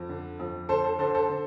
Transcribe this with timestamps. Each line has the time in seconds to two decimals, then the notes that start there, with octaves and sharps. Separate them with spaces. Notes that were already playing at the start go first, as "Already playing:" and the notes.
Already playing: F2
0.09 D3
0.39 F2
0.69 D3 A4 C5
0.84 A4 C5
0.99 D3 A4 C5
1.15 A4 C5
1.29 D3